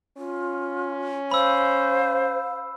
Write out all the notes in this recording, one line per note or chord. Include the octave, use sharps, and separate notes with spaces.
C#4 F4
C5 F5 B5 E6